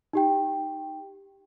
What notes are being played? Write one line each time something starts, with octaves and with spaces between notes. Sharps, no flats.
D#4 G4 G5